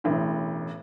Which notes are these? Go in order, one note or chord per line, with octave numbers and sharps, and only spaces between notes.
E1 A1 A2